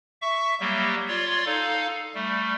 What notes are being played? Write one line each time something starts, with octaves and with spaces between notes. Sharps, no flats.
E5 C#6
F#3 G3 A#3 G4
F4 C#5 D5 C6
D#4 A4 F5
G3 A3